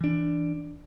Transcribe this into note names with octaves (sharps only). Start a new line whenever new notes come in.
E3 D4